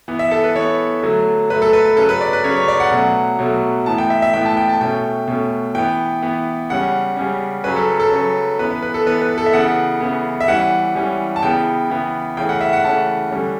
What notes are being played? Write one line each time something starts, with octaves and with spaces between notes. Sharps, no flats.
E3 B3
E5
A4
B4
E3 B3 C#5
D3 F#3 A3
D3 F#3 A3 B4
A4
B4
B4
C#3 F#3 C#4 A4
B4
D5
B4
C#3 F#3 C#4 C#5
C#5
D5
F#5
B2 F#3 A3
B2 F#3 A3
A2 E3 B3 A5
G5
E5
E5
A2 E3 B3 G5
A5
G5
A5
B2 A3 C#4 G5
B2 A3 C#4
E3 B3 G5
E3 B3
C#3 G3 C#4 F#5
C#3 G3 C#4
C#3 F#3 C#4 B4
A4
A4
C#3 F#3 C#4
E3 B3 B4
B4
B4
A4
E3 B3 B4
B4
A4
E5
C#3 E3 B3 F#5
C#3 E3 B3
E5
E3 G3 C#4 F#5
E3 G3 C#4
A5
C#3 E3 B3 G5
C#3 E3 B3
C#3 E3 A3 C#4 G5
F#5
E5
F#5
C#3 E3 A3 C#4 A5
D3 G3 C#4